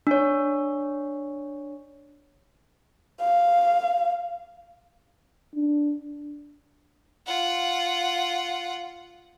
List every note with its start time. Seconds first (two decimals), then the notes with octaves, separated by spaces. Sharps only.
0.07 D4 C#5
3.21 F5
5.56 D4
7.27 F4 F#5